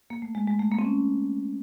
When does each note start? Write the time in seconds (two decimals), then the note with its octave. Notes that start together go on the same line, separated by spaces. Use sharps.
0.10 A#3
0.22 A3
0.35 G#3
0.48 G#3
0.60 A3
0.71 A#3
0.79 C4
0.84 C#4